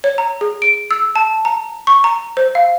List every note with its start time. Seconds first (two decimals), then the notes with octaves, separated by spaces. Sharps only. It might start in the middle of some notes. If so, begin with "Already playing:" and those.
0.04 C#5
0.18 A#5
0.41 G#4
0.62 D7
0.91 E6
1.16 A5
1.45 A#5
1.87 C#6
2.04 A#5
2.37 C5
2.55 F5